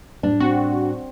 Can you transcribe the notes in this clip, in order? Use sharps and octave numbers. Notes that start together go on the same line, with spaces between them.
A2 G3 D4 D5
C4 F#4